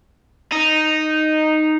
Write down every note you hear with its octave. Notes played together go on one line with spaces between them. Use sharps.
D#4